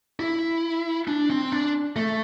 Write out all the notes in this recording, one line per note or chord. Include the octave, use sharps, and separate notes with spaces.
E4
D4
C4
D4
A3